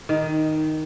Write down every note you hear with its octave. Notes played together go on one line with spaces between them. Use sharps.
D#3